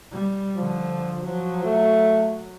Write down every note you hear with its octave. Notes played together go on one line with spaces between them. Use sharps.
G3
D3 F3
F3 F#3
A3